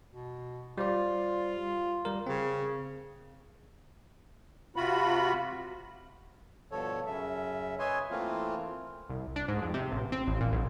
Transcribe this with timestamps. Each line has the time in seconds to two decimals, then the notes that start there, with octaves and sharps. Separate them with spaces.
0.12 B2
0.78 G3 F4 C5 D5
2.05 G3 A#4
2.26 C#3 C4
4.76 C3 F4 F#4 B5
6.71 G2 B2 F3 A4 C#5
7.06 F#2 C#3 E5
7.79 B4 C#5 D#5 E5 G#5 C6
8.11 E3 A3 A#3 C4 F4
9.10 C2
9.36 D4
9.48 G#2
9.62 F2
9.74 C3
9.92 A1
10.12 C4
10.27 A1
10.41 A#2
10.52 B1